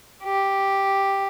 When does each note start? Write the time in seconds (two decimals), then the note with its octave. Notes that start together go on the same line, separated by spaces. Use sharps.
0.23 G4